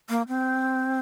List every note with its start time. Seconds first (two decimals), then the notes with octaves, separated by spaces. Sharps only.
0.09 A#3
0.28 C4